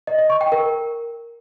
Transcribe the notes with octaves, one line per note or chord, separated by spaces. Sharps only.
D#5
D#5
C#6
G5
A#4